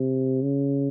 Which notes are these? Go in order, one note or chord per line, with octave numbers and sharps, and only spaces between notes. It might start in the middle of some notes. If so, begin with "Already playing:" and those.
Already playing: C3
C#3